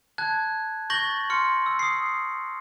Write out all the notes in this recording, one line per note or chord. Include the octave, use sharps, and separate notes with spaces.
A5 F#6 G#6
C#6 G6 A6 A#6 F#7
C6 F6 C#7
E6
D#6 C7